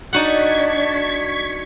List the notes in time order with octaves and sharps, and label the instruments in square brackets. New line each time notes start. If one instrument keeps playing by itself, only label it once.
[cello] D4 D5 [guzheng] D#4 F#4 F#5 [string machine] C#6 G#6 B6